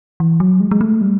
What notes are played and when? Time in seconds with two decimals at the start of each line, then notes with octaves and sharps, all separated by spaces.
0.20 E3
0.40 F#3
0.60 G#3
0.71 G#3
0.81 A3
1.01 G3